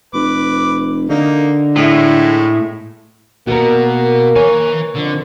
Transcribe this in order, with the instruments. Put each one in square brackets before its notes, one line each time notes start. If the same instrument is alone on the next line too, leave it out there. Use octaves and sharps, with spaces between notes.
[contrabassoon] F1 [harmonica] B4 D6
[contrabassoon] D3 [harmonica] A#3 D#4
[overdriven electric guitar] A2 [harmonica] G#3 A3 E4
[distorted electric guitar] B2 B3 [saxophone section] A#3 [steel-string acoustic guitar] F#4 A#4
[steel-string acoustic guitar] A#4 C#5 [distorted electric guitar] B4 G#5
[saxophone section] F2 [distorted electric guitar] D3